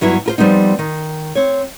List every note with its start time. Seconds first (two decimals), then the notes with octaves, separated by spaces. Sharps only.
0.01 G2 F#3 B3 E4
0.26 F4 A#4 C5
0.38 F3 G3 B3 C4 D#4
0.79 D#3
1.35 C4 C#5